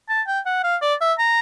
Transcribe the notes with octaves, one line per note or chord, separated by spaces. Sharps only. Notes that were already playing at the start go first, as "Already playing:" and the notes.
A5
G5
F#5
F5
D5
E5
A#5